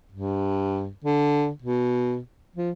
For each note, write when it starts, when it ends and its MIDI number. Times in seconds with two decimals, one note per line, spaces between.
0.12 0.89 43
1.04 1.50 50
1.62 2.19 47
2.56 2.71 53